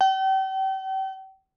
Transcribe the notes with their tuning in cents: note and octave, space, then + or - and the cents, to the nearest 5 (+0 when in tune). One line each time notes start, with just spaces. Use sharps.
G5 -40